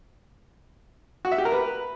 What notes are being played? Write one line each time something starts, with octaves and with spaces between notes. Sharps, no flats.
F#4
E5
G4
A#4
B4